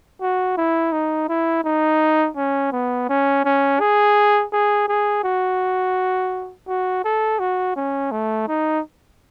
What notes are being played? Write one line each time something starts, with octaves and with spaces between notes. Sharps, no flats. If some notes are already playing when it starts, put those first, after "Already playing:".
F#4
E4
D#4
E4
D#4
C#4
B3
C#4
C#4
G#4
G#4
G#4
F#4
F#4
A4
F#4
C#4
A3
D#4